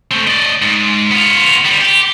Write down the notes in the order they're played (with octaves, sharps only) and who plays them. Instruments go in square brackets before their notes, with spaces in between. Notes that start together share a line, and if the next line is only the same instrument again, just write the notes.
[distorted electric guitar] A3 C4
D5 D#5
G#2
B3 F4
G3 B3
G4